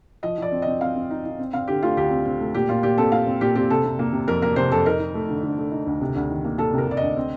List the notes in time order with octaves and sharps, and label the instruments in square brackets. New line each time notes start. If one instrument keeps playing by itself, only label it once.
[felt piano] F3 D#5
F3 D5
C4
C4 D#5
C4 F5
C4
D#4
D#4
C4
C4 F5
D3 G4
A3 F4
D2 G4
C4
C4
A3
A#2 G4
A#2 F4
A#2 G4
C4 A4
A#2 F5
C4
A#2 G4
C4 G4
C3 A4
C3
A#3
C3
F2 A#4
A#3 A#4
C3 C5
F2 A4
D#4 A#4
D#4
A3
D3
D3
A3
D#4
D2
C3
D2
D#3
A#3
A#3 A4
C3 A#4
C3 D5
D2 D#5
C4